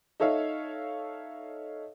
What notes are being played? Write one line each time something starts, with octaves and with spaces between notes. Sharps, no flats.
D#4 A4 C#5 E5 F5